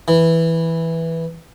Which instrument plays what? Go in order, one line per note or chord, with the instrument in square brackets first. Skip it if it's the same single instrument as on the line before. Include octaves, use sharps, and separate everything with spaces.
[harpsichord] E3